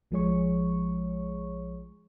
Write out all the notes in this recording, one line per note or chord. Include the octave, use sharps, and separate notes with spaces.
A#1 F3 G#3 G#4 C#5 C#6